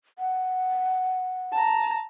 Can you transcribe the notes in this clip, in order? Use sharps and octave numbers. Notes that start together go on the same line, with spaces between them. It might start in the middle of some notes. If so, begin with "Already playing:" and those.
F#5
A5 A#5